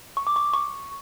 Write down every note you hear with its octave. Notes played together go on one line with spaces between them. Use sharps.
C#6
D6
C#6
C#6